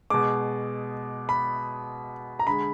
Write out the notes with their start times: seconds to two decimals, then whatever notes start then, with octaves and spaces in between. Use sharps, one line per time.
0.10 B2 G#3 D6
1.29 B5
2.39 A#5
2.47 D3 G#3 B5